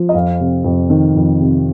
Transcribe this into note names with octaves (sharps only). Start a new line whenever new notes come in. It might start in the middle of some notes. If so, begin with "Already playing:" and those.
Already playing: F3
D#5
F2 F5
C3
F2
D#3
F2
C3